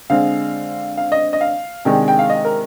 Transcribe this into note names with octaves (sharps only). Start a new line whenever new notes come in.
D3 G#3 C4 F5
F5
D#5
D#5
F5
C3 D#3 G#3 D4 G5
G5
F5
D#5
A#4